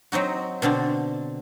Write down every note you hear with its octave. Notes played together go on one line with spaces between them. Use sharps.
F#3 C4 D#4 F#4
B2 D3 C4 D4